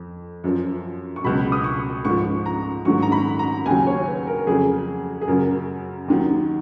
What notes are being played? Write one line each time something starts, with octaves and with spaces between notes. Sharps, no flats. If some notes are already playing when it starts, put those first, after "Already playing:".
Already playing: F2
F#2 F3
C#6
C#2 B2 F#3 B5
D#6
C#6
G#2 F3 C#6
A#5
G#2 D#3 F#3 C#6
A#5
B5
A#5
D#2 C#3 F#3 G#5
C#5
B4
A#4
F2 C#3 F#3 G#4
G#4
F#2 C#3 F#3 A#4
D#2 D#3 F#3